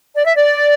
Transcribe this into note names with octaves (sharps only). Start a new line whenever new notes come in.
D5
E5
D5